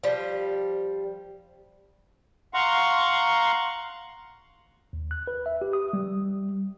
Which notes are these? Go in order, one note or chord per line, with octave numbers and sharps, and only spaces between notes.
F3 G3
F5 F#5 A#5 C6 C#6
D#2
F#6
B4
E5
G4
D#6
G3